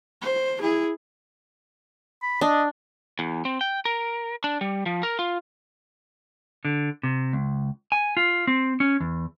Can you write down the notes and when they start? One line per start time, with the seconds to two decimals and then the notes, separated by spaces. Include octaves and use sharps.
0.22 C5
0.61 E4 G#4
2.22 B5
2.41 D4 D#5
3.19 E2
3.45 C4
3.61 G5
3.85 A#4
4.44 D4
4.61 G3
4.86 F3
5.03 A#4
5.19 F4
6.65 D3
7.03 C3
7.33 C#2
7.92 G#5
8.17 F4
8.47 C4
8.80 C#4
9.00 E2